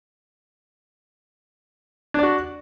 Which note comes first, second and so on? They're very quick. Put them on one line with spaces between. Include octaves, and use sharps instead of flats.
D4 D5 F#4